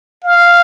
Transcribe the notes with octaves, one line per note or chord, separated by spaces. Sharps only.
F5